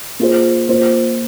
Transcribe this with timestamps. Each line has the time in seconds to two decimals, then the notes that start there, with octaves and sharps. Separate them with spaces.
0.20 A#3 F4 G#4 C5
0.69 A#3 F4 C5